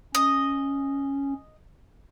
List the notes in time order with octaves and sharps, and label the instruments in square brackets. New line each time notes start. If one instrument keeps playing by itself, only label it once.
[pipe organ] C#4 [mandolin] D#5